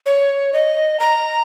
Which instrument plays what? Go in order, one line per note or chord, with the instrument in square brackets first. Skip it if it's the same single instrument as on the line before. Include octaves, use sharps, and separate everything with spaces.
[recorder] C#5
D#5
A#5